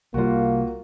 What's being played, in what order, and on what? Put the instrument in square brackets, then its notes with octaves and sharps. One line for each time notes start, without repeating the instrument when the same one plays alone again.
[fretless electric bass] C2 G3 [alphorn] A#3 [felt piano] F4 F#4